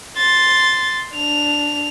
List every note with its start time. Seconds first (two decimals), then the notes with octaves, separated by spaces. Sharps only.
0.18 C6 A6
1.15 D4 F7